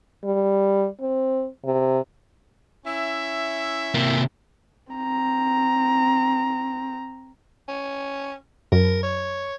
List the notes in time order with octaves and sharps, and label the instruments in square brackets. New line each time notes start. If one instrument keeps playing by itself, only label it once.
[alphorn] G3
C4
C3
[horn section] C#4 E4 E5
[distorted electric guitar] C3 A#3
[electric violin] C4 A#5
[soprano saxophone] C#4
[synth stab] F#2 [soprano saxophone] A#4
[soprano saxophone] C#5